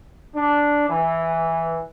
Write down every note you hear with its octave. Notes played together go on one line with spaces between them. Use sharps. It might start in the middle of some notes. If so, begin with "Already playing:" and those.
D4
E3